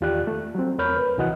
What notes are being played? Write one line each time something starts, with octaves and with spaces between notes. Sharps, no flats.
E2 D#3 F4 G4 D5 F#6
A3
F#3 C4
E2 A#4 C#5 B5 F6 G6
B4
C2 E3 F#4 D#5 F#5 F#6